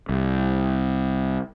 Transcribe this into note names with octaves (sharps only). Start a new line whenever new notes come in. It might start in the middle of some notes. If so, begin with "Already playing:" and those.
C2